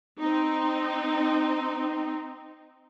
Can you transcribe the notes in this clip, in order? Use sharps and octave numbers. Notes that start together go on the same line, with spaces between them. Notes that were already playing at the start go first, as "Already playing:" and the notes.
C4 D#4